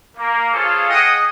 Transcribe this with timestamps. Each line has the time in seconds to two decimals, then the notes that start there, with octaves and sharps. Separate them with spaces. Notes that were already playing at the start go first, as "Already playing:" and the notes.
0.18 A#3
0.53 F4 G#4 A4 C5 C#5 F5
0.89 G#4 D#5 F#5 G5 D#6